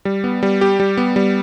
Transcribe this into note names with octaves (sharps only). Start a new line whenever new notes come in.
G3
B3
G3
G4
G3
B3
G3